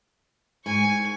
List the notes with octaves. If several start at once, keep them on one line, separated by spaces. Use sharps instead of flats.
G#2 G#5 C#6